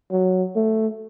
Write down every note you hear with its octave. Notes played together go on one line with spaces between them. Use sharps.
F#3
A3